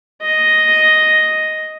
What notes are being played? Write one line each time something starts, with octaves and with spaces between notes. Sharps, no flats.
D#5